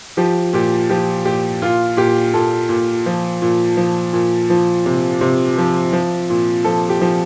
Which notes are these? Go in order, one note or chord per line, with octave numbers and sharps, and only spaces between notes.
F3 G4
A#2 G4
F3 G4
A#2 G4
A#2 F4
A#2 G4
A#2 A4
A#2
F3
A#2
F3
A#2
F3
C3
C3
F3
F3
A#2
F3 A4
G4
F3